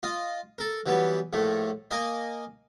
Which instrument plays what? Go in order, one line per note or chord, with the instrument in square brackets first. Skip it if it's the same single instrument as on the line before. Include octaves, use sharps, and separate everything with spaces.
[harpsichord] F4 D#5
A4 A#4
E3 F#3 G3 B3
A#1 A2 A3
A#3 A#4 D#5 G#5